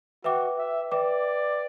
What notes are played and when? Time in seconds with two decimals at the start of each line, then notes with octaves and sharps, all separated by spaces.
0.24 F#4 B4 E5 G5 D6
0.58 E5
0.92 B4 D5 E5 G5 D6